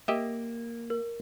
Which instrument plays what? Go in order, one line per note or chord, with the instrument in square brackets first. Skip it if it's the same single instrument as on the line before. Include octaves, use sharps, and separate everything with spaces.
[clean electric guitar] A#3 [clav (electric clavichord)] G4 D#5 E5
[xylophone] A#4